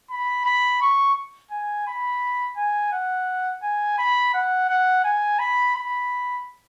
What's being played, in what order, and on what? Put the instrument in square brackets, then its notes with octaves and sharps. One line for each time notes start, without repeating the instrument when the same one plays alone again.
[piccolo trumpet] B5
B5
C#6
G#5
B5
G#5
F#5
G#5
B5
F#5
F#5
G#5
B5
B5